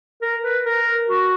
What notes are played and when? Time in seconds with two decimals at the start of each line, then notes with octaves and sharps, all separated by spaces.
0.22 A#4
0.43 B4
0.65 A#4
1.09 F#4